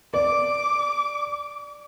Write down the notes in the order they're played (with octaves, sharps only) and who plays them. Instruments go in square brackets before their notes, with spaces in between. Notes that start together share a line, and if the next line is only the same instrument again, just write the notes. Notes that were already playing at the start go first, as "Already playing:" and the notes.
[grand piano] D5 [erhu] D6